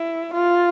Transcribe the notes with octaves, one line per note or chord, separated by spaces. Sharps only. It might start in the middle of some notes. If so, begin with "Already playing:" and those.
Already playing: E4
F4